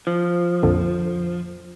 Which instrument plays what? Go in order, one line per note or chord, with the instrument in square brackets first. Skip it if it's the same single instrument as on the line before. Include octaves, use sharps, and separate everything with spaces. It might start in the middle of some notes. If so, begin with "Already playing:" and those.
[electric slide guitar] F3
[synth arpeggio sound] A#1 F2 D3